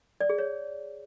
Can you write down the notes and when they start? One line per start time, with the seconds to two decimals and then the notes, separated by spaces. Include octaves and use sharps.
0.21 D5
0.29 G#4
0.38 C#5